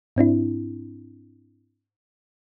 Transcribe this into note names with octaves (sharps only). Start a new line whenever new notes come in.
G#2 C4 D4 E4